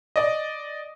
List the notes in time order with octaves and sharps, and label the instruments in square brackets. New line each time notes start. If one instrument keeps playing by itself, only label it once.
[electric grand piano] D5 D#5